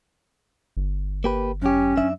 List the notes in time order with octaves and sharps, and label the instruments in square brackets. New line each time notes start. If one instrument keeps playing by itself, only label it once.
[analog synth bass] G1
[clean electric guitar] A#3 G4 B4
[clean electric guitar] F#2 G4 [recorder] C#4
[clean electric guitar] F#2 D4 E5